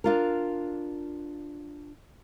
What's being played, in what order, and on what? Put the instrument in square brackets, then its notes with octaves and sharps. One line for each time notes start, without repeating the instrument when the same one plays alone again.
[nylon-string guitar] D4 F4 A#4